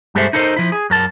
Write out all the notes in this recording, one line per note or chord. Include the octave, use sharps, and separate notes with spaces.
G2 G#3 G4 A4 C5 E5
D#4 E4 A4 A#4 C5 D#5
F3 E4
G#4
F#2 A#4 A5